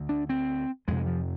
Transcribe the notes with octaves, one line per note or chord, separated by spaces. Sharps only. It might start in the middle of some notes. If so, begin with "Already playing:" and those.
Already playing: D2 D3
D4
C4
F2 C3 G#3
F3